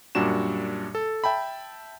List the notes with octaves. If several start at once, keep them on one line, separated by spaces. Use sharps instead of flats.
F#2 A#2 G3 D4 F#4 E7
A4
E5 G5 A5 B5